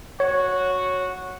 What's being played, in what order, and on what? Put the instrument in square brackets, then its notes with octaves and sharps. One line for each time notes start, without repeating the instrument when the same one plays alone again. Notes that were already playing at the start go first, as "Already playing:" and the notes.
[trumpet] F#4 [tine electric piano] C#5